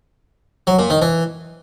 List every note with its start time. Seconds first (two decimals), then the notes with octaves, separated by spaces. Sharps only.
0.67 F#3
0.79 A#2
0.90 D#3
1.02 E3